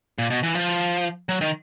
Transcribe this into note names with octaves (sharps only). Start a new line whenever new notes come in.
A#2
B2
E3
F3
F#3
D#3